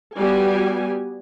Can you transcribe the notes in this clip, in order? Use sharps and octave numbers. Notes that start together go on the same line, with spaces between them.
G3 B3 F#4 G4 G#5